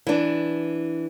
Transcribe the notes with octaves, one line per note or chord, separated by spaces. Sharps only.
E3 D4